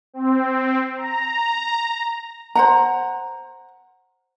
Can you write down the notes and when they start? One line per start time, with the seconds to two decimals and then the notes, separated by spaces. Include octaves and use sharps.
0.14 C4
0.97 A#5
2.55 C5 F#5 A#5